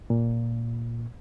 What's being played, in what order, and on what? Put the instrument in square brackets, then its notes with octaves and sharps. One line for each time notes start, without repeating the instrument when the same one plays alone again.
[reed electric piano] A#2